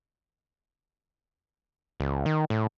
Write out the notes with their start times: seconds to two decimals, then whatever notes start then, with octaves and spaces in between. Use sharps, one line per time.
2.00 C#2
2.26 D#3
2.50 A2